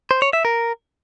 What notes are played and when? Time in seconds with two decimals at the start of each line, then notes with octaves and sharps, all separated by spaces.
0.11 C5
0.22 C#5
0.33 E5
0.45 A#4